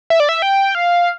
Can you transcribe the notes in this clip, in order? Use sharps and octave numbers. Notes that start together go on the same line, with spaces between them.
E5
D5
E5
G5
F5